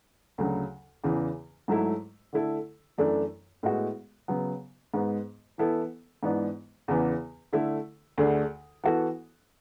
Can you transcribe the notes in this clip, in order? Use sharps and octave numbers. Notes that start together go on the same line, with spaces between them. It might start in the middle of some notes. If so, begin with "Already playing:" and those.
D2 C#3 F#3
E2 C#3 E3
G#2 F#3 A3 E4
D3 A3 E4 A4
F#2 E3 A3 D4 A4
A2 G#3 B3 F#4
C#3 F#3 B3
G#2 G#3 B3
E3 B3 E4 A4
G#2 E3 B3 D4
E2 C#3 E3 B3
D3 A3 E4 A4
D2 D3 A3 D4 G#4
E3 B3 F#4 A4